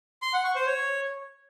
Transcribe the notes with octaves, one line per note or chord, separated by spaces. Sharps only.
C6
F#5
C#6
C5
C#5